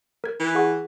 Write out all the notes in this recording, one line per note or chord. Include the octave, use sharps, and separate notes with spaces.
A#4 G#6
E3
G#4 F#5 C#6